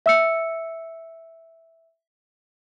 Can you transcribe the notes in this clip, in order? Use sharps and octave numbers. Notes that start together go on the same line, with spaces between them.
E5 E6 C#7